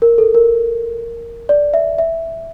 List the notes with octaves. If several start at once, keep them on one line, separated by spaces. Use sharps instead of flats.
A#4
A4
A#4
D5
E5
E5